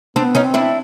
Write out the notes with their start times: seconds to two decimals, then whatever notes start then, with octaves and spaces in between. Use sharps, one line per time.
0.16 B3 C4 D4
0.35 C#4 D#4
0.45 C4
0.54 D4 E4